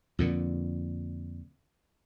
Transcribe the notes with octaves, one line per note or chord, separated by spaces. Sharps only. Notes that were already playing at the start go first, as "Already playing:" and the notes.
F2 A#2 D3